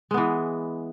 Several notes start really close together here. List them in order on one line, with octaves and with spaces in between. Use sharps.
G#3 B3 E3